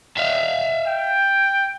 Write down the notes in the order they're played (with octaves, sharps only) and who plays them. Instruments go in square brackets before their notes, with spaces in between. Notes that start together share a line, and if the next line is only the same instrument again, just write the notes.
[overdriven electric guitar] E5 F5
[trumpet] G5